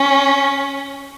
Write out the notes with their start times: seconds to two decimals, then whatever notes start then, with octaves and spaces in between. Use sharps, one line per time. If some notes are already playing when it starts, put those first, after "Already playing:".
Already playing: C#4